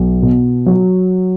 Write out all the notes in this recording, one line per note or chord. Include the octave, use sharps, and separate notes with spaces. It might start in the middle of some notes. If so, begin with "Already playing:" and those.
Already playing: B1
B2
F#3